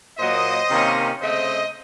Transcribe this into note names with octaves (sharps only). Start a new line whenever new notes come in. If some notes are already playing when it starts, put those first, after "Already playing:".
A#2 F#3 A#3 C5 D#5
C3 D#3 A#3 C#4
C#3 A3 C4 C5 D#5